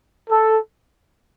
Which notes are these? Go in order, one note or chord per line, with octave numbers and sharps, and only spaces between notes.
A4